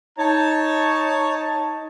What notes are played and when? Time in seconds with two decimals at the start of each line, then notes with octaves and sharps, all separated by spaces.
0.19 D#4 C#5 A5